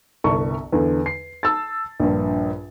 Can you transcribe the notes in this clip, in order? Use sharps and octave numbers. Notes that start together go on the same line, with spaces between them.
G1 C2 A5 C#6
E2 D3
C7
A5 E6 A6
A#1 G2